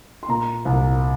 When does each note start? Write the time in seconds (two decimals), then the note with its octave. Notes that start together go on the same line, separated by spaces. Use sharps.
0.23 C6
0.28 A#2 A#5
0.65 C2